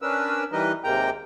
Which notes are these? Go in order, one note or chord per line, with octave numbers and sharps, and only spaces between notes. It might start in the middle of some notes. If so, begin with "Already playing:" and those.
C#4 D4 A#4 B4 E6
E3 G3 D#4 A#4 B4 D#5
D#2 C3 G#3 A#3 G5 A#5